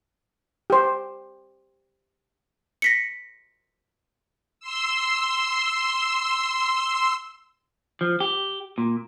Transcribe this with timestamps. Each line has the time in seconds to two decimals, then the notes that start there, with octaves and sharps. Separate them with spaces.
0.70 G4 C5
2.82 A#6 B6 C#7
4.60 C6 E6
8.01 F3
8.20 G4
8.78 A#2